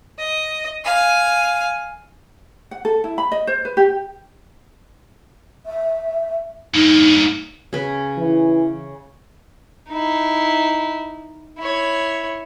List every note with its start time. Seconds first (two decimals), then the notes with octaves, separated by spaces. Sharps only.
0.18 D#5
0.85 F5 G#5
2.71 F#5
2.85 A4
3.04 E4
3.18 B5
3.32 D#5
3.47 C5
3.65 B4
3.77 G4
5.66 E5
6.74 G2 A#3 D#4
7.73 C#3 B4
8.18 E3
9.89 D#4 E4
11.59 E4 C#5